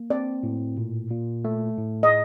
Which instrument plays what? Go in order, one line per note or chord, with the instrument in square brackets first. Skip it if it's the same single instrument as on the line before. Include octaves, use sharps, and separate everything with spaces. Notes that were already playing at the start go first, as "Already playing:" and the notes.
Already playing: [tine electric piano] A#3
[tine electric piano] C4 [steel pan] D5
[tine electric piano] A2
A#2
A#2
A3
A2
[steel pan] D#5